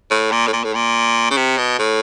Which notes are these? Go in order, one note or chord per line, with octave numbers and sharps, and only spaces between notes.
A2
A#2
A2
A#2
A2
A#2
C#3
C3
B2
A2